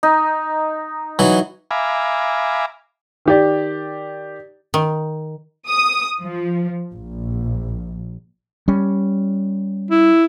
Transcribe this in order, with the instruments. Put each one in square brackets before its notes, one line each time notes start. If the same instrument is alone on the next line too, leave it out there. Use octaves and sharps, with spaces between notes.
[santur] D#4
[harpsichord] E3 F#3 D#4
[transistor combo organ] E5 F5 G#5 A#5 B5 D6
[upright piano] D#3 G4 D5
[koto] D#3
[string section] D#6
F3
A#1
[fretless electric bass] G3 C#4
[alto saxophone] E4